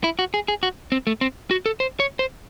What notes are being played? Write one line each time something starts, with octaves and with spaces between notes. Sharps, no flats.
E4
F#4
G#4
G#4
F#4
C4
A3
C4
F#4
A4
C5
C#5
C5